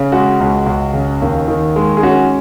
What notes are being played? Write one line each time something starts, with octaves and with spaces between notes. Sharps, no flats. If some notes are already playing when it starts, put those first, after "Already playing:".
Already playing: C#3
G#3 F#4
C#2
C#2
C#3
D#2
D#3
G#3
G#4
C#4 F#4